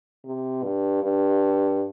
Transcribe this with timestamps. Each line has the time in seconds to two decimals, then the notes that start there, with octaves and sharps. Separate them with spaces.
0.25 C3
0.64 G2
1.03 G2